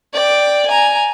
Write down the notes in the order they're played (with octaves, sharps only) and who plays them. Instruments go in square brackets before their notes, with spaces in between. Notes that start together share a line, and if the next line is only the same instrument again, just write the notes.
[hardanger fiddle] D5 G5
G#5 A#5